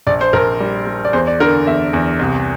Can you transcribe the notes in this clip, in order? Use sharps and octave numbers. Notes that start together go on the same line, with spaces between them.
A#1 D5
C5
A#1 A#4
G3
G3
D5
E2 C5
D5
D3 A#4
E2 E5
E2
C2